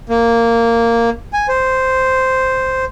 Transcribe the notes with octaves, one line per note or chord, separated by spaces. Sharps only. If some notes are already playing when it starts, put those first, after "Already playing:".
A#3
G#5
C5